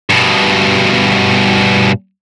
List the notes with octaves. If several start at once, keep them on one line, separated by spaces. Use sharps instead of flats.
G2 B2